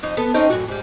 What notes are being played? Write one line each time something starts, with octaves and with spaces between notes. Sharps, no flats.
F2 D#4
B3 A4
C4 C#4 D#4
F#2 A2 F#4
G#2 G3